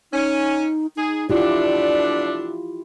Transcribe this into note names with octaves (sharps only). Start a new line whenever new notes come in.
C#4 D#4
D#4 G#4
B2 A3 D4 E4 F4 G4 D5